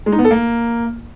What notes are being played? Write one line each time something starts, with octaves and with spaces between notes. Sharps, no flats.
G#3
D#4
B3
A4
A#3